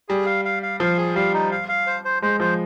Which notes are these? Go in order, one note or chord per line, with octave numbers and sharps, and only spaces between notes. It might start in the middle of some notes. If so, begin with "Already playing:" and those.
G3 G#4
F5
F5
F5
F3 F5
G#4
G3 F5
D#4
F5
F5
C5
C5
G#3 C5
F3 C5